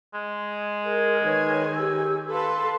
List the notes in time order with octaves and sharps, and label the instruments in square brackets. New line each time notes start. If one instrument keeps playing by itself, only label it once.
[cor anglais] G#3
[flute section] G#4 A#4
[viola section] D#3 G#4 G#5 [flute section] B4 C#5 G#6
[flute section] G4 E6
[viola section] A4 B4 A5 [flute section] F5 C6